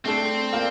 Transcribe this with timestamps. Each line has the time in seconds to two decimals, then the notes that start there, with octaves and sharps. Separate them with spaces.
0.05 A3 C4 D4 A4
0.53 A#3 F4 A#4 D5 F5